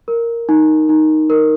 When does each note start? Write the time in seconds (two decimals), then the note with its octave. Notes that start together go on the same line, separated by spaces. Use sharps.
0.08 A#4
0.49 D#4
0.89 D#4
1.30 A#4